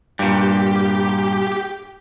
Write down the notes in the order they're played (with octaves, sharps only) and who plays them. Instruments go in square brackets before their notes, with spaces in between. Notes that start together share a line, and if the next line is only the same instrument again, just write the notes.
[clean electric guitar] G2 A#2 [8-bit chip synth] G4